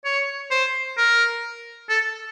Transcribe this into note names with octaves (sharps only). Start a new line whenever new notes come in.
C#5
C5
A#4
A4